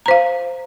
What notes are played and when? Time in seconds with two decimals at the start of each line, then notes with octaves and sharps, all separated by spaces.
0.06 A#5
0.08 C5
0.11 F5